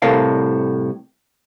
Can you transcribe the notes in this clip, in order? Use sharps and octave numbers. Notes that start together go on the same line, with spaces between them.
C2 A2 C3 A4 A#4 F5